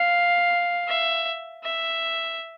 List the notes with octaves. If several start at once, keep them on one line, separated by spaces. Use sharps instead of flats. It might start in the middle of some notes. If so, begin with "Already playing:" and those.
Already playing: F5
E5
E5